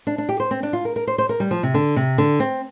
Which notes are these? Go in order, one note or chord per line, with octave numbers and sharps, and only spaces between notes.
D4
D4
G4
C5
C4
D4
F4
A#4
A#4
C5
C5
A#4
G3
F3
C3
D3
C3
D3
C4